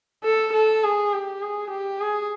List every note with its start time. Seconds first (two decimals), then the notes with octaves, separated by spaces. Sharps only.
0.24 A4
0.53 A4
0.83 G#4
1.13 G4
1.42 G#4
1.71 G4
2.00 G#4